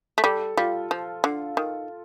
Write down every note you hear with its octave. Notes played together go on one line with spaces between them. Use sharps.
A3
G3 A4
G3 F4
F3
D3
D#3